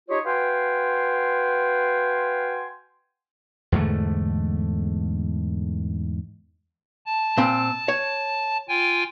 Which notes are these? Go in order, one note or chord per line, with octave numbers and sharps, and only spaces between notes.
D#4 F4 G4 G#4 C#5
F#4 B4 F5 G5 G#5 C6
E2 G#2 D3 A3
A5
A#2 C4 B5
C#5
F4 G5 G#5